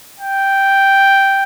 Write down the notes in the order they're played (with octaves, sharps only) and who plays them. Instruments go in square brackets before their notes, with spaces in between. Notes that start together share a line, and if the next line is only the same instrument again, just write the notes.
[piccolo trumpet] G5